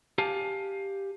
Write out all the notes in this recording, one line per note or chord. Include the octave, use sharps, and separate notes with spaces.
G4 F5 G#5 A5